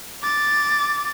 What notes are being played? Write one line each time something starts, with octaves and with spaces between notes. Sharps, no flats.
D6 A6